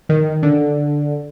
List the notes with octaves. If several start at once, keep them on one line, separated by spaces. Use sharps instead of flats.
D#3
D3